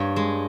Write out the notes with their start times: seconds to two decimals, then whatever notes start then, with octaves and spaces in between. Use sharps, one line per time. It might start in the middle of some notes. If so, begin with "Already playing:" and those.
Already playing: G2 A#3 C#5
0.16 G#3